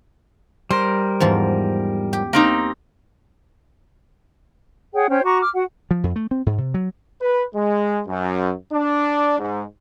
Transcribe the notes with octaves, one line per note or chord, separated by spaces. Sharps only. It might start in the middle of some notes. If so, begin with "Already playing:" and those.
G3 A#4 C5
E2 G#2 F3
G4
A#3 C4 D#4
G#4 C#5 F#5 G5
C#4 C5 C#5 G5
F#4 A#5 C#6 D6
D6 F6
F#4 F#5
F3
F2
A3
C4
G#2
C3
F#3
B4
G#3
F#2
D4
G#2